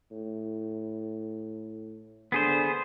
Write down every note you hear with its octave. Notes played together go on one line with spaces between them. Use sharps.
A2
D3 B3 G#4 C5